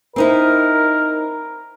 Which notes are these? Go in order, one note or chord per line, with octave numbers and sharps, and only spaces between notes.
C4 D#4 E4 A#4